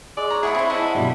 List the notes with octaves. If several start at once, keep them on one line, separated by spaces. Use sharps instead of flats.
G#3 D5
C#5 A#5
E4 G#4 F#5 B5
C4 E4 C5
E4 D#5 F#5 A5
G2 B2 F#3 G3